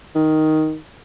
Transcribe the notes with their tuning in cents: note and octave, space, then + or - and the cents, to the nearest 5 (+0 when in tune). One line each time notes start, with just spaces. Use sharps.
D#3 +5